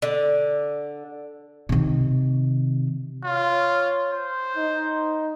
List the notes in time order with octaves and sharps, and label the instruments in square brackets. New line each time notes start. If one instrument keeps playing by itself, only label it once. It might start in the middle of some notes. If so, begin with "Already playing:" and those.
[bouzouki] D3
[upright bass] C3 D#3
[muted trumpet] F4 [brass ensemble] C#5
[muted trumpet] C5
[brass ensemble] D#4